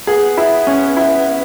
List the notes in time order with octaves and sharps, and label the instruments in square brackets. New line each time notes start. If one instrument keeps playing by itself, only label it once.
[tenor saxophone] B3 [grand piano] G#4
[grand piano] E4
C#4
E4